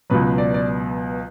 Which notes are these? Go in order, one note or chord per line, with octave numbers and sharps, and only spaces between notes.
C#2 B2 F#3 B4
D5
D5